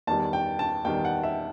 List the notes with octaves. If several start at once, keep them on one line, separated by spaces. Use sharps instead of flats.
E2 D#3 G3 A5
G5
A5
E2 D#3 G3 G5
F#5
E5